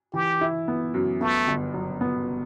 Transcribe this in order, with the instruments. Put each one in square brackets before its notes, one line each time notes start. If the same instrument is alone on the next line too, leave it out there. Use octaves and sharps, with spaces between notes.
[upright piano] E3 [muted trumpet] G4
[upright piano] E4
B3
F#2
[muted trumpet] A3 [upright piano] B3
[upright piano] G1
F#3
B3